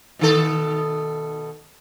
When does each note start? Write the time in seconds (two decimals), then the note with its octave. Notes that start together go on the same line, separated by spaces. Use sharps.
0.19 B2 D#3 A4